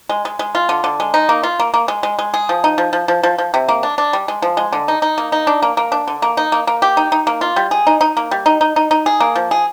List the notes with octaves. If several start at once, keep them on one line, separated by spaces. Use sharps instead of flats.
G#3
G#3
G#3
F4
D3
D3
G#3
D#4
A#3
F4
A#3
A#3
G#3
G#3
G#3
G#4
F3
D#4
F3
F3
F3
F3
F3
C3
A#3
D4
D4
G3
G#3
F3
G#3
D3
D#4
D#4
A#3
D#4
D4
A#3
A#3
D4
D3
A#3
D#4
A#3
A#3
G4
D#4
D#4
A#3
F4
G3
G#4
D#4
D#4
A#3
G3
D#4
D#4
D#4
D#4
G#4
A#3
F3
G#4